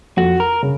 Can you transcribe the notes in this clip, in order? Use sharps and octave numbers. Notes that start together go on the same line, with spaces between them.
F2 F#4
A#4
C#3